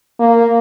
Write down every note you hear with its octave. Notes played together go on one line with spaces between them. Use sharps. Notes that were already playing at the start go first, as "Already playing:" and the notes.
A#3